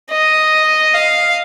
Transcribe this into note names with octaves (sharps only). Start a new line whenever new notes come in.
D#5
F5